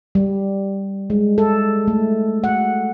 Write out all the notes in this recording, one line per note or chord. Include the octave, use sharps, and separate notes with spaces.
G3
G#3
A4
A3
F#5